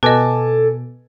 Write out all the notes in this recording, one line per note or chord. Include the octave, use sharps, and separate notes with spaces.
B2 A4 B4 D#5 G#5 A5 D6